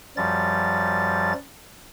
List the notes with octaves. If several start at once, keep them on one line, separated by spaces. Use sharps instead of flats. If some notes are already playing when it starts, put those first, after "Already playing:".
F#2 F3 G3 A6